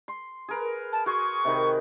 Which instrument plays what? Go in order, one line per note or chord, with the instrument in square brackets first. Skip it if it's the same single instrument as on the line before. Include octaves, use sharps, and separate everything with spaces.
[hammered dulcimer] C6
G#4 A#4 B4
[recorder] A5
[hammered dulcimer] F#4 G#4 C6 [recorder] C#6
[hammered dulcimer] C3 D#3 B5